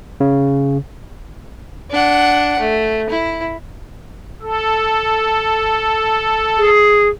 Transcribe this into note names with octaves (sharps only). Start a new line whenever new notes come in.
C#3
D4 F#5
A3
E4
A4
G#4